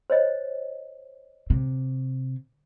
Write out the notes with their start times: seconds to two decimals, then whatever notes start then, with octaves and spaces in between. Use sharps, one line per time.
0.10 C5 C#5 D#5
1.50 C3